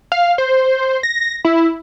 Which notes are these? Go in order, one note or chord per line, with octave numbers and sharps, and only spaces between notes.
F5
C5
A#6
E4